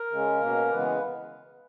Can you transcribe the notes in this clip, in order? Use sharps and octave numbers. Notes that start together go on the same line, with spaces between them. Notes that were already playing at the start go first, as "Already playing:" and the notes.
Already playing: A#4
C#3 G#3 C#4
B2 A#3 C#4
C#3 E3 G#3 B3 B4